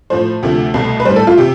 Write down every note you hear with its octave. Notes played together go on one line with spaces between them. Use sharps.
A2 F3 A3 C5
D2 C3 F3 A3
C2 B2 A3
B4
A2 G3 C5
A4
F4
C3 G4